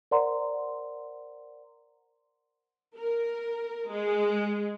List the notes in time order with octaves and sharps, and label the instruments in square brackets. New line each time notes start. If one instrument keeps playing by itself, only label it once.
[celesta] A#4 C5 D5 F#5 A#5 C6
[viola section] A#4
G#3